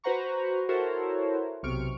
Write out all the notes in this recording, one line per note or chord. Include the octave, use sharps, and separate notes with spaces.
F#4 B4 C5 F#5 A#5 C#6
E4 F#4 A4 A#4 C5 C#5
B1 C3 C#6 F6 D7